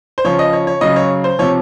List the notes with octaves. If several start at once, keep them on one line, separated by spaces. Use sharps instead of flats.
C5
C#3 F3 C#5
D#5
C#5
C#5
C#3 F#3 D#5
C#5
C5
C3 F3 C#5